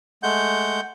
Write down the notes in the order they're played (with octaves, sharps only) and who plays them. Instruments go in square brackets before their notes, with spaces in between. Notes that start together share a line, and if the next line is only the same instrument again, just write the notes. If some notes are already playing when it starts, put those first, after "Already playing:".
[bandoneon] G#3 A3 F#5 G6